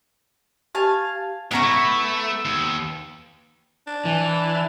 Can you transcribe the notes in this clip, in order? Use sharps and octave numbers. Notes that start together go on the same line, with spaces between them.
G4 F5 G#5 A5
A2 C#3 B3 C#4 A#5 C#6
A3 E4
E6
D#2
D4
E3